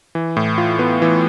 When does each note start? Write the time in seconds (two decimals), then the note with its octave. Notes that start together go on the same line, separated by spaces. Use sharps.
0.15 E3
0.37 A2
0.58 F4
0.79 B3
1.02 E3